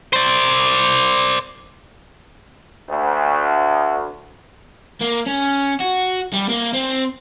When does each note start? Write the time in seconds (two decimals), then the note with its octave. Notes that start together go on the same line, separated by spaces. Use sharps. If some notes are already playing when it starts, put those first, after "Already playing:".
0.13 C5 D5
2.90 D2
5.01 A#3
5.26 C#4
5.80 F#4
6.33 G3
6.49 A#3
6.74 C4